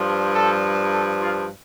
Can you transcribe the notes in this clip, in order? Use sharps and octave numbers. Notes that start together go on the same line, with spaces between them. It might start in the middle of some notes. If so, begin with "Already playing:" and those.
Already playing: G2 F3
A4
A4
F4